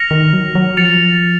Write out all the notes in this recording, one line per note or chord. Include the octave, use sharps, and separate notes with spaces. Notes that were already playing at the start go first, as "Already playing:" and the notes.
Already playing: F6 A#6 C#7 F7
D#3
F#3
F#3
F3 A6 C#7 F7